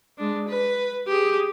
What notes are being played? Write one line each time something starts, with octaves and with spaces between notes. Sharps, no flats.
G#3 D4
B4
G4 G#4